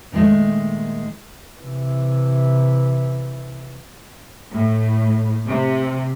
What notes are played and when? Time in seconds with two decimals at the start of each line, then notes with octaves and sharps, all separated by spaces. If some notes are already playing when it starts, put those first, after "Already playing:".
0.12 A#2 D#3 E3 G#3 A3
1.61 C3 E3
4.52 A2
5.46 C3